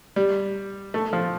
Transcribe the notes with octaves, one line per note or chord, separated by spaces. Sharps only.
G3
A3
F3